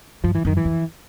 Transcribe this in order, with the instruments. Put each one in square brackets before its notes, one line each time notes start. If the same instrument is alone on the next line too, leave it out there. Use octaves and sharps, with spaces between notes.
[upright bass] G2 [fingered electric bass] F3
[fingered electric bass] E3
[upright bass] F#2 [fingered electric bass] D#3
[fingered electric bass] E3
[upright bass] F2